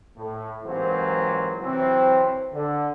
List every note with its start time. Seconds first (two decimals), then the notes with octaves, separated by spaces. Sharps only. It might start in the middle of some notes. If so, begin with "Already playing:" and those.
0.16 A2
0.64 G#2 C3 E3 F#3 A#3 C5
1.59 C3 E3 F#3 C4
2.52 D3